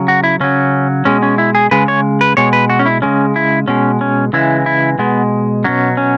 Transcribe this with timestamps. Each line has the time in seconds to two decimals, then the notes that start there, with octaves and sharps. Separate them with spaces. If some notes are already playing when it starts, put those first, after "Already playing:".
Already playing: C#3 F#3
0.08 F#4
0.24 E4
0.40 C#3 F#3 C#4
1.05 B2 G#3 C#4
1.23 C#4
1.38 E4
1.55 G#4
1.71 C#3 G#3 B4
1.88 C#5
2.21 B4
2.37 B2 G#3 C#5
2.53 B4
2.70 F#4
2.79 C#4
2.86 E4
3.02 C#3 G#3 C#4
3.36 E4
3.68 B2 G#3 C#4
4.01 C#4
4.33 C#3 E3 G#3 E4
4.66 E4
4.99 B2 G#3 B3
5.64 B2 F#3 C#4
5.97 C#4